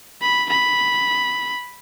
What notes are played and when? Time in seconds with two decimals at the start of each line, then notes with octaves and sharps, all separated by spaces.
0.22 B5
0.50 B5